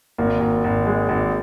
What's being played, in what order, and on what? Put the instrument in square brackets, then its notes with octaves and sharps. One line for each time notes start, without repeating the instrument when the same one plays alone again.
[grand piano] G#1 [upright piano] A#3
[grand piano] G#1
G#1
G#3
G#1